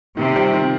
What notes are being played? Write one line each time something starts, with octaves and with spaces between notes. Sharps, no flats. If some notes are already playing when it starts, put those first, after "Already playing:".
C3 D#3
G3 C4 F4
D#3